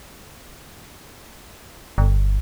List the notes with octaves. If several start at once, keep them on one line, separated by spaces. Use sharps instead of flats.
G1